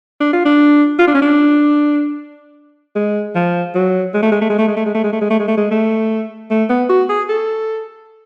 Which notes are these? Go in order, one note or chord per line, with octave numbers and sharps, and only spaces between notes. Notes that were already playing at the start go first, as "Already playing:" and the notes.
D4
F4
D4
F4
D4
C#4
D4
G#3
F3
F#3
G#3
A3
G#3
A3
G#3
A3
G#3
A3
G#3
A3
G#3
A3
G#3
A3
G#3
A3
G#3
A3
A3
B3
F#4
G#4
A4